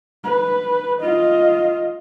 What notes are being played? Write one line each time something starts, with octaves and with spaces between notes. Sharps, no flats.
B4
F4 D#5